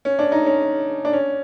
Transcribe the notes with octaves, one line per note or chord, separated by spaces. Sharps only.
C#4
D4
D#4
C#4
D4
C#4